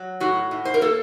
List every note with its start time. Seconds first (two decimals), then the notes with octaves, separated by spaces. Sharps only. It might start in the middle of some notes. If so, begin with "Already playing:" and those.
Already playing: F#3
0.20 A2 F#4
0.51 A2
0.65 C5
0.74 A#4
0.81 A#3 A4